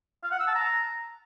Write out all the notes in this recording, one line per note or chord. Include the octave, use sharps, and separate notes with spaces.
F5
F#5
E6
A5
A#5